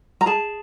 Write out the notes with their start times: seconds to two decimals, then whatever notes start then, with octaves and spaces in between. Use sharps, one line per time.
0.21 A#5
0.26 G#4 A5